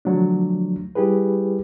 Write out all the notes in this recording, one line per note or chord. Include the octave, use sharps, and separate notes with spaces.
D3 F3 F#3 A3 D4
G3 E4 G4 G#4 B4